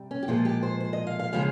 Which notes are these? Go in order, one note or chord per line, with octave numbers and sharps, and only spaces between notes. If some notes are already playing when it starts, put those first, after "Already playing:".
Already playing: C3 G3
C#4
G4
A#2 F3 G#3 F4
G4
C5
C5
D#5
F5
F5
C#3 F3 G#3 F5